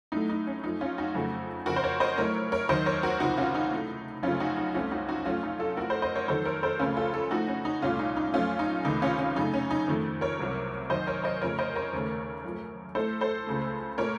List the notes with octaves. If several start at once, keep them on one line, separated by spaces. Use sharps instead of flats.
A2 F#3 A3 D#4
D#4
C#4
F#2 F3 A3 D#4
C#4 F4
D#4 F#4
F2 C#3 F#3 A3
F2 C#3 F3 F#4 A#4
C5
A#4 C#5
C5 D#5
A2 F#3 A3 A#4 C#5
A#4 C#5
D#2 D#3 F#3 C5 D#5
A#4 C#5
F#4 A#4
C#2 C3 F3 D#4 F#4
C#4 F4
D#4
A2 A3
F#2 C#3 F3 A3 C#4 F4
D#4 F#4
D#4
C2 C3 F3 A3 C#4 F4
D#4 F#4
D#4 F#4
F#2 F3 A3 C#4 F4
D#4
F4 A4
A2 F3 A3 F#4 A#4
A4 C5
C5 D#5
A#4 C#5
F2 D#3 F#3 A4 C5
A#4 C#5
A4 C5
C#2 C#3 F3 A3 C#4 F4
F4 A4
F4 A4
A2 F3 A3 D#4 F#4
C#4
D#4
C2 A#2 A3 C#4 F4
D#4
D#4
F#2 F3 A3 C#4 F4
D#4
C#2 C3 D#3 A3 D#4
C#4 F4
C#4 F4
F#2 C#3 A3 D#4
C#4
D#4
F2 D#3 A3
A#4 C#5
C2 C3 F#3
F#2 D#3 F#3 C5 D#5
A#4 C#5
C5 D#5
F2 C#3 F3 A3 A#4 C#5
C5 D#5
A#4 C#5
D#2 C#3 A3
F#2 F3 A3
A2 A3 A4 C5
A4 C5
C#2 C#3 A3
A#2 A3 A#4 C#5